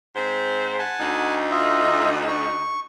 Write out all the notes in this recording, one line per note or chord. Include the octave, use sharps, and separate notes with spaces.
G#2 C4 C5
F#5 G#5 A5
D2 D#4
F4 D#5 E5
C#6